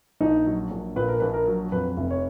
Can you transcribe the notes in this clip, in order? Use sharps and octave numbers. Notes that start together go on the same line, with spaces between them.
A#1 D#4
F#3
A#1
A#2 B4
A#4
A#1 B4
A#4
F#3
F2 B4
F1
C#5